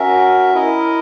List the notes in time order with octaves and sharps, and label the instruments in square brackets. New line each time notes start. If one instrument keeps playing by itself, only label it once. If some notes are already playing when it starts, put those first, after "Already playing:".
Already playing: [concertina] C#4 F#4 A#4 E5
E4 A#4 D#5